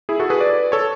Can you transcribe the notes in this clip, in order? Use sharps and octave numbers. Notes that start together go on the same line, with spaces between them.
E4 G#4
F#4 A4
G#4 B4
B4 D5
A4 C#5